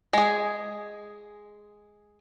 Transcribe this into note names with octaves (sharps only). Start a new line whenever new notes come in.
G#3 G#4